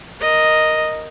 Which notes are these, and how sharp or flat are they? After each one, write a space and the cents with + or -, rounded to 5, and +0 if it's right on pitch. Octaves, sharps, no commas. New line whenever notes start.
A#4 +0 D#5 +0